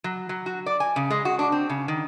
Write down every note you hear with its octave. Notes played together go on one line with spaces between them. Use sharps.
F#3
F#3
F#4
D5
G#5
C#3
G#3
F#4
D4
C4
C#3
D#3